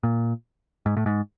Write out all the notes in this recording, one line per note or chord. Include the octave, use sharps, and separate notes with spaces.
A#2
G#2
A2
G#2